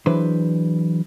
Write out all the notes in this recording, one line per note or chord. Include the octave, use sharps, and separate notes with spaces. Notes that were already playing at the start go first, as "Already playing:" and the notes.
E3 F#3 D4 G#4 B4 C5